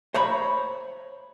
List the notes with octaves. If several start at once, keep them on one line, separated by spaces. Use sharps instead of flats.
C5 C#5 A#5 B5